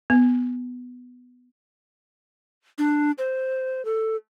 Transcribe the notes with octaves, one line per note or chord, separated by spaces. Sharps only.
B3
D4
C5
A4